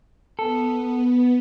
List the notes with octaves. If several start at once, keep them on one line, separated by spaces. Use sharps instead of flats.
B3 A4